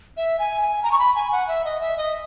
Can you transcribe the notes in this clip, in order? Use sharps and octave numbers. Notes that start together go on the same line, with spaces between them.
E5
G#5
G#5
A#5
C#6
B5
G#5
F#5
E5
D#5
E5
D#5